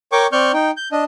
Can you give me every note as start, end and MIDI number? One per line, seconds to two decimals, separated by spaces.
0.12 0.27 70
0.12 0.27 73
0.12 0.27 79
0.12 0.27 85
0.12 0.27 86
0.32 0.52 60
0.32 0.52 74
0.32 0.52 85
0.32 0.52 89
0.32 0.52 91
0.53 0.71 63
0.53 0.71 79
0.77 0.88 91
0.92 1.04 62
0.92 1.04 75